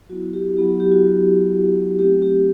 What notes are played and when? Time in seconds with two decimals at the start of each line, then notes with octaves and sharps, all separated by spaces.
0.09 F#3 B3 E4 F#4
0.33 G4
0.57 F#3 B3 E4 G4
0.68 G4
0.80 G4
0.92 F#4
1.04 F#3 B3 E4
1.51 F#3 B3 E4
1.99 F#3 A3 C4 D#4 F#4 G4
2.22 G4